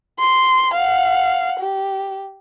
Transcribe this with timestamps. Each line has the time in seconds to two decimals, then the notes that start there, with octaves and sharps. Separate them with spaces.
0.19 C6
0.74 F5 F#5
1.60 G4